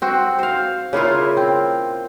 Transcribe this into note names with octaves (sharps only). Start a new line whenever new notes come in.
C4 F#4
C5 F5
C#3 A#3 E4 F4
C4